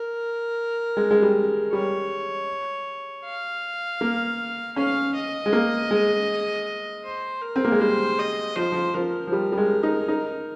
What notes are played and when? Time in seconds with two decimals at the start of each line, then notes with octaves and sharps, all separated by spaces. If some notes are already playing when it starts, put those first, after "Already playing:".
Already playing: A#4
0.97 G#3
1.11 G#3
1.22 G3
1.73 G3 C#5
3.25 F5
4.01 A#3
4.76 C#4 F5
5.15 D#5
5.46 G#3
5.53 A#3
5.91 G#3
7.04 C5
7.42 A#4
7.56 C4
7.65 A#3
7.72 G#3
7.80 G3 C5
8.19 D#5
8.56 F3 C5
8.72 F3
8.94 F3 A#4
9.27 F3
9.32 G3
9.52 G3
9.58 G#3
9.83 D#4
10.08 D#4